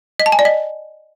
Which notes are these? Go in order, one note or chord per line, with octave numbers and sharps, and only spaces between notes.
D#5
A5
G#5
D5
D#5